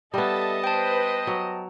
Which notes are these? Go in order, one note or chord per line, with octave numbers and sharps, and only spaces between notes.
G3 B3 A4 D#5 E5 A5
B4 C5 G5 A5
F#3